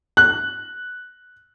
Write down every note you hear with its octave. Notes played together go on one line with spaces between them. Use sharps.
F#6